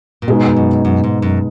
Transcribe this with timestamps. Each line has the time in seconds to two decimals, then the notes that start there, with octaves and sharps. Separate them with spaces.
0.22 A#2
0.28 G#2 B2 G#3 B3 D#4
0.46 F2
0.57 F#2
0.85 F#2
1.04 G#2
1.22 F#2